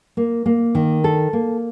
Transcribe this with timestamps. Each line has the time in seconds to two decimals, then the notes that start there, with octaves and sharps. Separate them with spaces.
0.17 A#3
0.46 A#3
0.75 D#3
1.04 A4
1.33 A#3